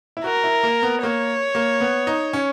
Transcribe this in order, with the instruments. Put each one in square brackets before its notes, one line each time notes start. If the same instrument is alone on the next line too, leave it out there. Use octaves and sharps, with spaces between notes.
[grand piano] E4
[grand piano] F#4 [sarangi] A#4
[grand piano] E4
A#3
B3
[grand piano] A#3 [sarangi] C#5
[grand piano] A#3
B3
D#4
C#4